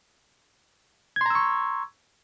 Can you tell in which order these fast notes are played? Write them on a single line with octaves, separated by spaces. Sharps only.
G#6 C6 A#5 E6 C#6